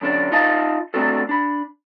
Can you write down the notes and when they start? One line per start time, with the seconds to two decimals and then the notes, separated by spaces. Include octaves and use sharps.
0.01 F#2 D3 C#4 D4
0.32 D#4 F4 D#5 F5 A5
0.94 A3 C4 D4 F#4 A4
1.29 D4 B5